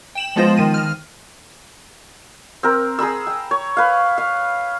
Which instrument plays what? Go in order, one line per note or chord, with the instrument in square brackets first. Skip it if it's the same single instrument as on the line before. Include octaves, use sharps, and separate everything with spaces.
[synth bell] G5 E7 F#7
F3 G#3 B3 F4 C5 A#6
D#3 D#7
F6
[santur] C4 A#4
G#4 A#5 B5 E6
G5
C#5
B4 F5
F5